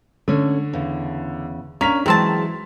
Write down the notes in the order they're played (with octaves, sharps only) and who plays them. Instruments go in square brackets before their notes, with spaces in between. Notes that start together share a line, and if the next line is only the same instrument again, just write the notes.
[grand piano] D3 [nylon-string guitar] A3 C#4
[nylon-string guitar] E2 C#3
[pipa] A#3 [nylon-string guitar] C#4 D4 [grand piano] C#6 B6 F7
[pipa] D#3 C4 A5 [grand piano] E3 [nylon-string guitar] F#3 G#3 G#4